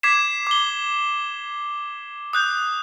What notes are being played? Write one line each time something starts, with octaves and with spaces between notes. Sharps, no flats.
D6 G#6 B6 C7 E7
D6 G7
D#6 F#6 G6